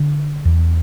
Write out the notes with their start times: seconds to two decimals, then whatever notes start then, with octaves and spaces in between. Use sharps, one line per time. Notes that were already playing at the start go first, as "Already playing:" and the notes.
Already playing: D3
0.45 E2